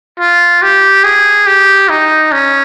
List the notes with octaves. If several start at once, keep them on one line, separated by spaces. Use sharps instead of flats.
F4
G4
G#4
G4
D#4
C#4